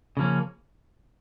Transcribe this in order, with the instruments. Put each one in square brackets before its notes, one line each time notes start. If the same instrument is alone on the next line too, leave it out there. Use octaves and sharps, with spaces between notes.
[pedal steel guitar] C#3 F3 A#3 C#4